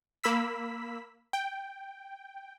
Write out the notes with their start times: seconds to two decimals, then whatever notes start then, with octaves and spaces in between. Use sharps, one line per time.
0.24 A#3 B5 E6 B6
1.33 G5